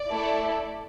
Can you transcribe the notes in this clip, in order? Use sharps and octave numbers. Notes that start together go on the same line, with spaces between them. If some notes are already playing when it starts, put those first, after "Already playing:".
Already playing: D5
A3 E4 A4